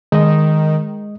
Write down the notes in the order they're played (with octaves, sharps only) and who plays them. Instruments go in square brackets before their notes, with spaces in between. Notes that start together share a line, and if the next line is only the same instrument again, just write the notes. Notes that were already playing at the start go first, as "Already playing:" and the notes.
[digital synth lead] D#3 [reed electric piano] G#3 D#5